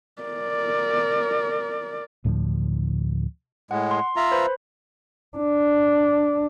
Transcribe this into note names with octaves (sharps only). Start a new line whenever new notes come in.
A#4 D5
D2 A2 D3 F3
A2 G#3 F#5
C6
F4 E5 A#5
B4 C5 B5
D4